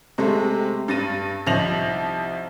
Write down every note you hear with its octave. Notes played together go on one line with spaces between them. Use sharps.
C3 G#3 A3
G2 A6 A#6 D#7
C2 F3 D#4 A#6 F7 F#7